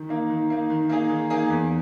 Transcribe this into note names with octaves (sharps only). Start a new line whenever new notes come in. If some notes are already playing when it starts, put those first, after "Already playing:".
Already playing: D#3
A#3 D#4
D#3
A#3 D#4
D#3
A#3 D#4 G#4
D#3
A#3 D#4 G#4
E2